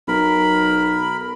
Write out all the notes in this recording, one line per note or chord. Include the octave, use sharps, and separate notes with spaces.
B1 A#4 B5